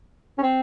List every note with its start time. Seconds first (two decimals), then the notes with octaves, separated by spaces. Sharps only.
0.38 C#4
0.43 C4